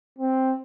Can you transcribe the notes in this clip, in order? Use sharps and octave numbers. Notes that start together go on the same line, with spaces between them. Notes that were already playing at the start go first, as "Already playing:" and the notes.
C4